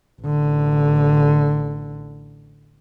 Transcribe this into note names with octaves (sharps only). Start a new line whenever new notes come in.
A1 D3